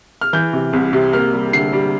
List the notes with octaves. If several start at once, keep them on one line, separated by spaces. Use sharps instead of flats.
F6
E3 G6
C3
C2
C3
A#3 F6
G3
D3 C7
G3